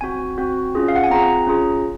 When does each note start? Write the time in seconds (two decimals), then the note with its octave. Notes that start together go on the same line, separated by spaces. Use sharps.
0.01 C4 F#4 G#5
0.38 C4 F#4
0.75 C#4 F4 G#4
0.88 F5
0.96 F#5
1.03 G#5
1.10 C4 F4 G#4 A#5
1.47 C#4 F4 G#4